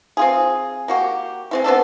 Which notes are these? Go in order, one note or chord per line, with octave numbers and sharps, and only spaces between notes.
C4 F4 G#4
A#3 F#4 G4
G#3 C4 E4
B3 C4 D4 A4